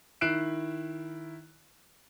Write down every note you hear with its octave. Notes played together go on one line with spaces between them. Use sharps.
D#3 E4 F#6 C7 D7 E7